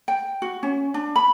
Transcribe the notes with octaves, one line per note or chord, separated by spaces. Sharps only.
G5
F#4
C#4
D4
B5